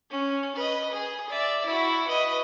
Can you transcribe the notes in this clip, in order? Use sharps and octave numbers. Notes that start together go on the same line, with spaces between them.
C#4
B4 D#5
G#4
D5 E5
E4 F#4
B4 D#5